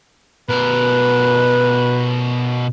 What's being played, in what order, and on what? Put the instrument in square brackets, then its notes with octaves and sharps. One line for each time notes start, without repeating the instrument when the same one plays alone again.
[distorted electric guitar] B2 A#4 [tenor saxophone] B4